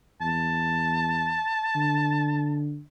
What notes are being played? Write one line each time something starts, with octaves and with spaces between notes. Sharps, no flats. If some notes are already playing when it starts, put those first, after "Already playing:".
E2 A5
D3